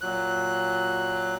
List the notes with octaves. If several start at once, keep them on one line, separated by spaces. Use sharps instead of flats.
A#2 F#3 F#6